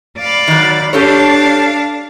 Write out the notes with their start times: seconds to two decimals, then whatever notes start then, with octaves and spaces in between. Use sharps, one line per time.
0.19 D5 F5 B5
0.48 D#3 F#3
0.93 D4 G4 A4 C#5 F5 A5